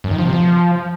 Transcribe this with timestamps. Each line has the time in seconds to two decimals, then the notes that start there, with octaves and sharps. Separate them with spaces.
0.04 F#2
0.11 D#3
0.18 F3
0.26 C3
0.33 F3